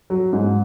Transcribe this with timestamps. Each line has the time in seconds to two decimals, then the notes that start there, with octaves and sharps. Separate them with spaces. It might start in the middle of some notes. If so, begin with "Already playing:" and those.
0.10 F#3
0.33 G#2